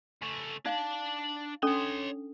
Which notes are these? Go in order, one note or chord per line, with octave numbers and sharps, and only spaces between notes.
C#3 A3
D4 D#4 F5 A5
C#4 D4 A4 C#5 C6